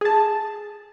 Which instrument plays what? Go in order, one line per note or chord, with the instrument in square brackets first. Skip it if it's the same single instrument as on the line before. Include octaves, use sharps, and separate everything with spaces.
[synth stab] G#4 A5